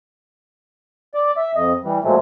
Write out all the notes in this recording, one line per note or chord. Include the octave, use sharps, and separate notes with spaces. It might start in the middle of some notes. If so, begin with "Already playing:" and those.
D5
E5
F2 D#5
E3 G3
A#2 F3 F#3 G#3 A3